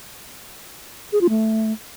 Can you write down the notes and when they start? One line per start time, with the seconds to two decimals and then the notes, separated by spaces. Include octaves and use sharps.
1.13 G#4
1.21 F4
1.30 A3